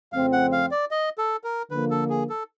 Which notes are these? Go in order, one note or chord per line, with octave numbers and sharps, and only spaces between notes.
F2 C#3 F3 A3 C4 F5
F#5
F5
D5
D#5
A4
A#4
D3 F3 A#3 B4
A4
G#4
A4